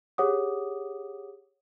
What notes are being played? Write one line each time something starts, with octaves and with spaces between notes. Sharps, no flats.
G4 G#4 C#5 F#5 D6 D#6